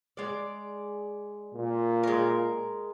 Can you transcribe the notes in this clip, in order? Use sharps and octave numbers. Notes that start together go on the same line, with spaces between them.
G#3 D5
A#2
G#3 A#4